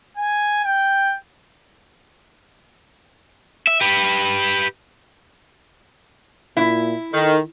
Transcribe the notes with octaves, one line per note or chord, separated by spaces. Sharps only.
G#5
G5
E5
G4 B4
A#2 E4
D#3 A4